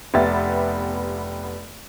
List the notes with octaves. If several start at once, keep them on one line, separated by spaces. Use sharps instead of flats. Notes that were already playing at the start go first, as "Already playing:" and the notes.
F1 B3 G4 E5 A6